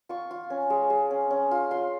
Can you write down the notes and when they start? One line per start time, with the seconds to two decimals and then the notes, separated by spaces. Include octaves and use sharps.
0.09 F4 C#6
0.31 F4
0.50 C#4
0.70 G#3
0.90 G#3
1.10 C#4
1.30 C#4
1.51 F4
1.71 F4 C6